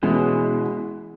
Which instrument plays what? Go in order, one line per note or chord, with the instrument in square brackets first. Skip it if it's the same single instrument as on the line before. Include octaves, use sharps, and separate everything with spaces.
[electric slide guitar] B2 [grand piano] E3 G#3 C#4 E4 G#4